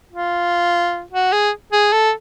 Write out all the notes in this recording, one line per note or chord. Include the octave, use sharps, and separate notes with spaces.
F4
F#4
G#4
G#4
A4